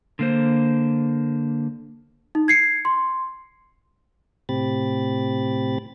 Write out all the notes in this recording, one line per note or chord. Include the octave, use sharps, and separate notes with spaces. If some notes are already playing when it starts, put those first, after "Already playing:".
D3 A#3 C5
D#4
G#6 C7 C#7
C6
A2 C3 C4 G4 B5 A6